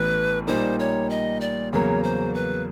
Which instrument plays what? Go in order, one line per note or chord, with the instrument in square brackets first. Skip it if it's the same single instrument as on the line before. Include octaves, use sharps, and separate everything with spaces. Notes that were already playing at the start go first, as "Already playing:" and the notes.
Already playing: [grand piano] A1 A2 E3 B3 [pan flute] B4
[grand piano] A#2 G3 A#3 D#4 [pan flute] C5
[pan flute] C#5
D#5
D5
[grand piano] E2 C#3 F#3 A#3 [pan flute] C#5
[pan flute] C5
B4